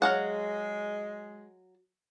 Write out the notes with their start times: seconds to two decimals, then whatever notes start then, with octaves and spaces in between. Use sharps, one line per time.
0.02 F#3 G#3 F5 F#5